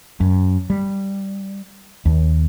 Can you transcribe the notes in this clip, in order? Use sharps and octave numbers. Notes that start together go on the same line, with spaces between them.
F#2
G3
D#2